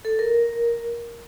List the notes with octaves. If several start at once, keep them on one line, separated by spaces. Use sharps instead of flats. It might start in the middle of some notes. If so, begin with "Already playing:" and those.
A4
A#4